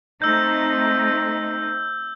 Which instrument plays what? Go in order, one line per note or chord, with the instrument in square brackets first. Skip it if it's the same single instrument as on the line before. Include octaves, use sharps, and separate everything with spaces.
[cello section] A3 C4 D#4 [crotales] E6 G6